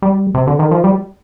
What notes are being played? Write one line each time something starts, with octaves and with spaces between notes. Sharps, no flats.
G3
C3
D3
D#3
F3
G3